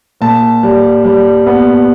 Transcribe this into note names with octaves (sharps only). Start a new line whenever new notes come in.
A#2 A5
G3
G3
B3